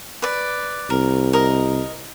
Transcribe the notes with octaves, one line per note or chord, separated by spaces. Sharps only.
B4 D5
C2 A#4
A#4 D#5